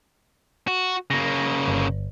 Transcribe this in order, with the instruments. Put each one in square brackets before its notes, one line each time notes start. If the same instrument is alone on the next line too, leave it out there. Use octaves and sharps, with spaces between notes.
[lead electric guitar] F#4
[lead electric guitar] C#3 A#3 [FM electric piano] A#6
[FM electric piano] G1